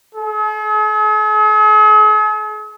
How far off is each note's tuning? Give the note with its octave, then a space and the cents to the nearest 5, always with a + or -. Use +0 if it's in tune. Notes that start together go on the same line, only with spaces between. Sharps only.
G#4 +45